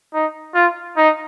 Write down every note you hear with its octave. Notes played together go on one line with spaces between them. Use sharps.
D#4
F4
D#4